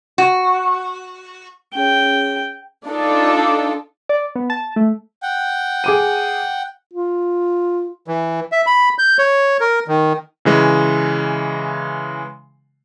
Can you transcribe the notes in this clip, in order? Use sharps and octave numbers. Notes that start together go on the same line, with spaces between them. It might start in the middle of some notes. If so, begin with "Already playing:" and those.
F#4
C#4 G#4 C#5 G5
D4 D#4 F4 A4
D5
B3
A5
A3
F#5 G5
G#4 D6 D#7
F4
E3
E5
B5
G6
C#5
A#4
D#3
C#3 E3 G#3